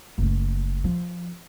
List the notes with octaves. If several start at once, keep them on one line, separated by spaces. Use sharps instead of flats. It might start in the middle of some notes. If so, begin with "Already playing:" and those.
F#1 A3
F3